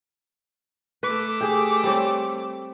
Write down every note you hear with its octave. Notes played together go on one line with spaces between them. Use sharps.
A3 B4 D6
G4 G#4
G3 C4 C#5